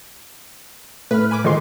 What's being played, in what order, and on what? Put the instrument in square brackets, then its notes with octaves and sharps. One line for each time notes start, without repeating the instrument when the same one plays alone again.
[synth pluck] A2 [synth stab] B4 B5 F6
[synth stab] G#5 B5 D6
[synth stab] D3 D#3 [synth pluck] F3 G#3 C6